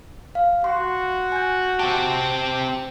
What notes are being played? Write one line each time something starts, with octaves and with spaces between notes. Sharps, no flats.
F5
F#4 C6
G#5 G6
C4 G4 A5